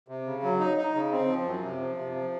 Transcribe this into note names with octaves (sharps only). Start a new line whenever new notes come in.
C3
C#3
F#3
D#4
D#4
C#3
C4
F3
F#2
C3
F3
C3
F3